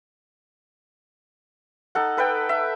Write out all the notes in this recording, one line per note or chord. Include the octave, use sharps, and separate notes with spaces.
D#4 A4 F#5
A4 B4 F#5 G5
E5